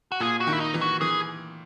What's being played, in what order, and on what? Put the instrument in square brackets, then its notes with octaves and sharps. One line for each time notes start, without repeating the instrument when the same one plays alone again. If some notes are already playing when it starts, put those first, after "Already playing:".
[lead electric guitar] F#4
[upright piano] A#2 [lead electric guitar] G#4
[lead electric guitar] F#4
[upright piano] D#3
[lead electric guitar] E4
D#4
[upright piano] E3
[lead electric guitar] F#4
[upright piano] E3 [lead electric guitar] G#4